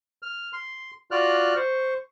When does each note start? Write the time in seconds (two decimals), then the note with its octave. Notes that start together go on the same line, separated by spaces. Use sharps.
0.23 F6
0.53 C6
1.11 F4 F#4 D5 F6 F#6
1.56 C5 C#6